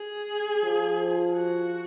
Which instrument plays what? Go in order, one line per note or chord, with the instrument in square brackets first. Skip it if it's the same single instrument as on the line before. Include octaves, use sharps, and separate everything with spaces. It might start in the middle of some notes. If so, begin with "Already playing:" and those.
Already playing: [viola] G#4
[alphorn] F3
[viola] F#4